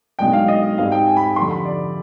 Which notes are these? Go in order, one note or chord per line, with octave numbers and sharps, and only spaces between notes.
B1 B2 G#3 D4 G5
F5
D#5
G#2 G3 C4 F5
G5
G#5
B5
F2 D3 G3 C6
B5
D5